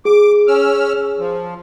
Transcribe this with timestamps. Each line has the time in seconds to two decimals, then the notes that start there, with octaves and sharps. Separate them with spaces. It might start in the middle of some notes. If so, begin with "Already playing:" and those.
0.05 G#4 D6
0.48 C#4 E6 F6
1.19 F3